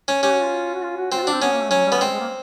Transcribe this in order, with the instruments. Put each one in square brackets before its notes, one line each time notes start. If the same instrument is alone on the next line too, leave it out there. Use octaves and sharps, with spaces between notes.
[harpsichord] C#4
[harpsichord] C#4 [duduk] G4
[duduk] F#4
F4
F#4
F4
F#4
[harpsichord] C4 [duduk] F#4
[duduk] F4
F#4
[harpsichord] D4
[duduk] C4
[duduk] B3 [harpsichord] C#4
[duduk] A#3
A3
[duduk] F#3 [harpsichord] C#4
[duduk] G3
[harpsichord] B3
[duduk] G3
[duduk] G#3 [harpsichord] C4
[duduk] G#3
A#3